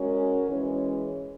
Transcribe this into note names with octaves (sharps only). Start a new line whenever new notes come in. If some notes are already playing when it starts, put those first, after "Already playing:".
Already playing: G#3 C#4 F#4 A#4 C#5
E3 G#3 C#4